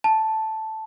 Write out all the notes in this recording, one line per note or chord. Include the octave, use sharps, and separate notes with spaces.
A5